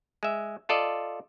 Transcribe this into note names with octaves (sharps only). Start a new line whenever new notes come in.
G#3 E5
F4 A4 D5 D#5